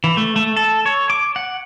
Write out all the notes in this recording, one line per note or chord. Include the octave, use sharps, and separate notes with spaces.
E3
A3
A3
A4
C#5
D6
F#5